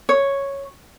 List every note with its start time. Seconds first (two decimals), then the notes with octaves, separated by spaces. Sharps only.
0.09 C#5